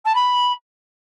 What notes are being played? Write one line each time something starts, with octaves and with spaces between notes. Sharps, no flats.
A5
B5